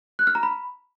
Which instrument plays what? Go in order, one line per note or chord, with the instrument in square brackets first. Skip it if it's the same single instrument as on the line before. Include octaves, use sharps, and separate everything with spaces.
[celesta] F#6
F6
A#5
B5